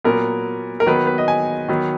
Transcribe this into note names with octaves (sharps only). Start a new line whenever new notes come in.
A#2 F#3 B3 A#4
A#4
D#3 F#3 B3 B4
B4
D#5
G#5
D#3 F#3 B3